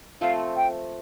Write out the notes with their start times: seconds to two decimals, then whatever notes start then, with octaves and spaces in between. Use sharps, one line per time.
0.21 F3 A3 C4 F4 F5
0.56 G5